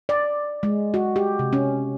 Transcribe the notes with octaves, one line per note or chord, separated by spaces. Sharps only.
D5
G#3
F#4
G4
C3
C#4